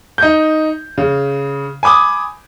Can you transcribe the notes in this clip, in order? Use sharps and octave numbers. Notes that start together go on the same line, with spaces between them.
D#4 G6
C#3
G#5 B5 D6 D#6